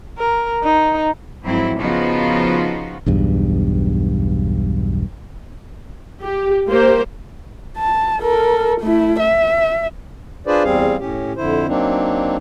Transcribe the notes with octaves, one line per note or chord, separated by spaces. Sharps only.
A#4
D#4
F2 G#2 F#3 C4 E4
C#3 F3 B3 D#4 F4 F#4
B1 E2 G2
G4
A#3 G4 C5
A5
A4 A#4
A3 E4
E5
D4 F4 G#4 B4 C5 D5
E2 G3 C4 G#4 F5
A2 C#4 G4
F2 D3 E4 C5
F#3 A#3 C4 D4 D#4